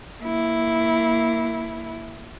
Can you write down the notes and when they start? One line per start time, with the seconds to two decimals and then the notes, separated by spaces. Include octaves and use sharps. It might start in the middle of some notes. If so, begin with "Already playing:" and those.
0.22 A#3 E4